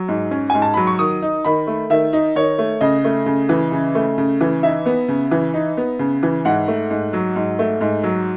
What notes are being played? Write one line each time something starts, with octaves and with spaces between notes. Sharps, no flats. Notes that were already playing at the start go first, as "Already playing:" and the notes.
Already playing: F#3
G#2
C#4
G#2 G#5
A5
F#3 B5
C#6
D#3 D#6
D#4
D#3 B5
A3
D#3 E5
D#4
D#3 C#5
A3
C#3 D#5
A3
C#3
E3
C#3
A3
C#3
E3
D#4 E5
B3
C#3
E3
D#4
B3
C#3
E3
G#2 F#5
A3
G#2
F#3
G#2
A3
G#2
F#3